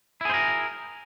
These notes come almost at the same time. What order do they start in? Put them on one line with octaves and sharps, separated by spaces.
E4 G#4 C5 A#4